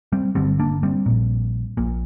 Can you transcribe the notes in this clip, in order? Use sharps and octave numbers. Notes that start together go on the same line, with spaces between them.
G3 C4
G1 G2 D3 G3 C4
A#3 D4
G3 C4
A#1 A#2
A#1 A#2